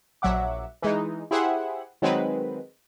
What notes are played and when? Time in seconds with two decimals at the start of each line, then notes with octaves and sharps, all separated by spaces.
0.22 A#1 F#3 E5 F#5 D6
0.82 E3 G#3 D#4
1.31 E4 G4 G#4 C5 E5 F#5
2.02 D#3 F#3 G#3 C4 B4